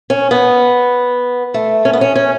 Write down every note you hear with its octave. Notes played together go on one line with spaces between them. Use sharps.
C#4
B3
A3
C#4
B3
C#4
C#4